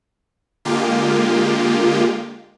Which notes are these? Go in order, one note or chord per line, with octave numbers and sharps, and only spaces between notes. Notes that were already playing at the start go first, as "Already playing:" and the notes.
D3 G#3 A#3 F4 G4